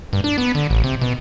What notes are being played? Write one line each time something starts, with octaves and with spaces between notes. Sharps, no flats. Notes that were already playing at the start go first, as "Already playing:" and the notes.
G2
D4
B3
D3
A1
C3
B2